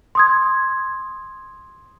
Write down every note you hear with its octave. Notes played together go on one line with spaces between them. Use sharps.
C6 D#6 G#6